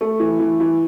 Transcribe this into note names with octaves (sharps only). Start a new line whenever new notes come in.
A3
E3
E3
E3